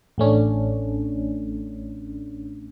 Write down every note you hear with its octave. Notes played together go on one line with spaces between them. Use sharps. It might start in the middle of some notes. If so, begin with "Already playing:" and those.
A1 A3 C#4 D4